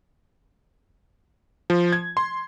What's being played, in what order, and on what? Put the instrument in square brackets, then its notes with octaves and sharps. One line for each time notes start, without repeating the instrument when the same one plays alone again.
[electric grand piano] F3
G#6
C6